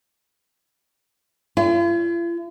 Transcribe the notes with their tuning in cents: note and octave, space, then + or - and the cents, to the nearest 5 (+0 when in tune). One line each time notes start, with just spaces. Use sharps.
F4 -45